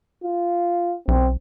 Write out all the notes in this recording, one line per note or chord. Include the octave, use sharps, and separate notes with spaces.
F4
B1 C4